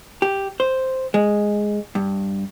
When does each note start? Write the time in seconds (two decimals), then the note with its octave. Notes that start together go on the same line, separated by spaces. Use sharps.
0.22 G4
0.60 C5
1.14 G#3
1.95 G2